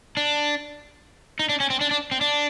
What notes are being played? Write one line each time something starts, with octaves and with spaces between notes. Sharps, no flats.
D4
D#4
D4
C#4
C4
D4
D4
C4
D4